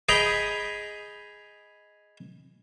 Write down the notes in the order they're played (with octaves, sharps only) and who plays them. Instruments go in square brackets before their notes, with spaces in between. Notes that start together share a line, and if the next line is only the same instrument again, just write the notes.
[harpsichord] G#4 D#5 G5 A#5 B5